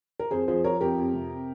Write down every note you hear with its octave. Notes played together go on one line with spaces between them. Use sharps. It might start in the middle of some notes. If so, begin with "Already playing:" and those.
A#4
F2 G#4 C5
F3 G#4 C5
F3 A#4 C#5
F2 G4 A#4
F2
C3